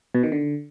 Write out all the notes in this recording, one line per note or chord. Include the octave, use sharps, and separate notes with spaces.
B2
D#3
D3